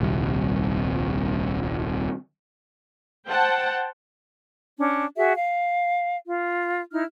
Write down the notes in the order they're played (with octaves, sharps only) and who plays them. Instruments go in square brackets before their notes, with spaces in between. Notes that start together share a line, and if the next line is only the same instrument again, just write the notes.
[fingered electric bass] D#1 C2 C3
[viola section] C5 F#5 G5 A5
[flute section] C#4 D4
F#4 G#4 E5
F5
F4
D#4 E4 F6